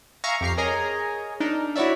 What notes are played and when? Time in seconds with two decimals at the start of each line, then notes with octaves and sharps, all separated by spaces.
0.24 E5 F5 G#5 A#5 C#6
0.41 F2 G4 A#5 C7
0.57 G#4 A#4 C#5 D#5 G#5 A#5
1.40 D4 D#4 A#4
1.76 E4 F#4 C#5 D5 E5